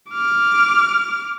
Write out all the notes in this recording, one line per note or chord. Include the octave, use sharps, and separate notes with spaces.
D6 F6